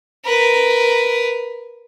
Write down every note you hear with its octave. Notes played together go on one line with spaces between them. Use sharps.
A#4 B4